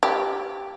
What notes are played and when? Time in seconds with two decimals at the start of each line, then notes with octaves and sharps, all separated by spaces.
0.03 G4